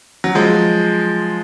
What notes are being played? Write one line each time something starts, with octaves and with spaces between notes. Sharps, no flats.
F#3
F3 G#3